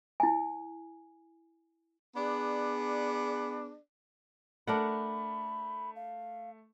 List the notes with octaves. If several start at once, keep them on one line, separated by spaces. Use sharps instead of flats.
E4 G#5
B3 D4 G#4 D5
A3 D4 A#4 F#5 B5
F5